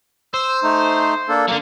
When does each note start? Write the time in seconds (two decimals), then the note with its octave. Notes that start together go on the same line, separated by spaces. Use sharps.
0.34 C5 E6
0.63 A3 D#4
1.29 A#3 D4 A4
1.48 D3 F#3 A#3